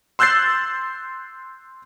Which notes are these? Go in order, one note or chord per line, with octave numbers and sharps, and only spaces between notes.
C6 E6 F#6 G6 A6 C7